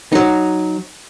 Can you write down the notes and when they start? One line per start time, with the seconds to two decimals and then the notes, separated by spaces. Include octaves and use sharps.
0.12 F#3 D#4